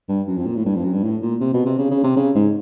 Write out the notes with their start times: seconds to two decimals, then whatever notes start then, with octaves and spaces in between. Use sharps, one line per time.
0.09 G2
0.27 F#2
0.37 F2
0.46 A#2
0.56 A2
0.65 G2
0.75 F2
0.84 F#2
0.94 G2
1.03 A2
1.22 A#2
1.41 C3
1.54 B2
1.66 C3
1.78 C#3
1.91 C#3
2.04 C3
2.17 C#3
2.35 G#2